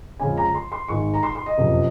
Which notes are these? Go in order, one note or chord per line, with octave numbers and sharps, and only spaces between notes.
F2 C#3 G#3 C#4 G#5
A#5
C6
C6
G#1 G#2 D#3 G#3 C#6
A#5
C6
C6
D#5
F#1 F2 C3